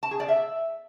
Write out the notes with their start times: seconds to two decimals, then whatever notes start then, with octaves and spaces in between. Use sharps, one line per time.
0.03 A5
0.11 G#4
0.20 D5
0.28 E5